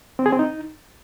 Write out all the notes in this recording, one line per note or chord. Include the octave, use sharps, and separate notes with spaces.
C4
G#4
C4
D#4